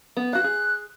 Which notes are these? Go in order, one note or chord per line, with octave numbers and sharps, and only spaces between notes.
B3
F#4 F5 F#6
G#4